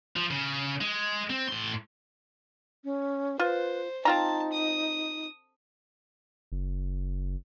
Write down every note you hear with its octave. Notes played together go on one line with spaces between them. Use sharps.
F3
C#3
G#3
C4
A2 C6
C#4
F4 B4 C5
C4 D#4 F4 A5 A#5
D#6
F#1